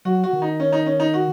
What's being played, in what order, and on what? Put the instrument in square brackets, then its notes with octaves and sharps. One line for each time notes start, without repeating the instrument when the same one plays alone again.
[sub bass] F#3 [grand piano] F#4
[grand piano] F#4
[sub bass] D#3
[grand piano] D#4
C#4
D#4
C#4
D#4
F#4